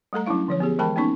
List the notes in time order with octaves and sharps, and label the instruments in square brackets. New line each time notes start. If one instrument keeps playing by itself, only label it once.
[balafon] G3 A3 A4 A#5
F#3 C#4 D4 E4 F5
D3 F3 C#5
B3 G4 G#4
E3 G#3 A#4 G5 A5 B5
A#3 B3 C#4 D#4 C#6